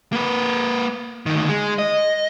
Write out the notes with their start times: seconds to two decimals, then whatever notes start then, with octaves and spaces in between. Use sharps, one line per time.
0.13 A#3 B4
1.26 D2 D#3
1.49 G#3
1.78 D#5